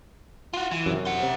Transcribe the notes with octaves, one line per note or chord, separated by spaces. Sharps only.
F4 F#4
E3
F#2 C3
C5 F#5
C3